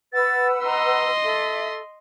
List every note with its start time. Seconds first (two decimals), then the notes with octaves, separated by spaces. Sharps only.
0.13 B4 F#5 E6 A6
0.65 D#5 A#5 C6
1.24 A4 E5